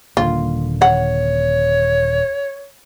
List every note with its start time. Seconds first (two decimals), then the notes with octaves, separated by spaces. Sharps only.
0.17 D#1 D3 A#3 F4
0.82 C#5 F#5